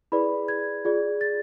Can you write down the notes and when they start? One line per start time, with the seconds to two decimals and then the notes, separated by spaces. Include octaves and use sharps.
0.12 E4 G#4 B4 D5 B5
0.48 G#6
0.85 F4 G#4 D5
1.21 A6